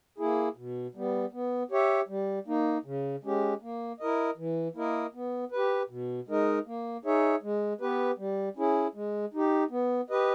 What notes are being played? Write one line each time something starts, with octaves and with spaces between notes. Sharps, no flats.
A#3 E4 G#4
B2
G3 B3
B3
G4 C#5 E5
G3
A#3 D#4
C#3
G#3 C#4 G4
A#3
E4 A#4 D#5
E3
A#3 E4 A#4 D#5
B3
G4 B4
B2
G#3 D#4 A#4 D#5
A#3
D#4 G#4 C#5 E5
G#3
B3 G4 B4
G3
C#4 E4 G#4
G#3
D#4 G4
B3
G4 B4 D#5